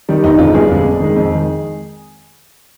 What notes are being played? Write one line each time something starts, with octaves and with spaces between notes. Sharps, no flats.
D#3 G3
G1 D#4
F2 D3 G#3 F4
G1 G#4
F2 D3 G#3
F2
D#3 G#3
F2
D#3 G#3